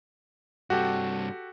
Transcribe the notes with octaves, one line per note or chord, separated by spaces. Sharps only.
G2 C3 F#4 G4 A4